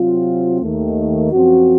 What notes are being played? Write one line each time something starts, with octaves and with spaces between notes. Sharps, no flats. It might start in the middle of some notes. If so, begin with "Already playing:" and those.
Already playing: C3 F#3 C4 F4
D#2 D#3 A3
F#2 F3 C4 F#4